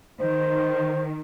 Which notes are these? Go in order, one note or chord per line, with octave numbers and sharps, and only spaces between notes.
D#3 C5